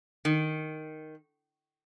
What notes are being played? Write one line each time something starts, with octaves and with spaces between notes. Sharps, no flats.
D#3